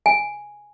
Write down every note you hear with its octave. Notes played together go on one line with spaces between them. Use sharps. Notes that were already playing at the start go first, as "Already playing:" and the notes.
G#5